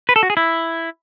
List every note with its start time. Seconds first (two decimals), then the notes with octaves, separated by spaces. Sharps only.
0.09 B4
0.16 A4
0.23 F#4
0.30 G#4
0.37 E4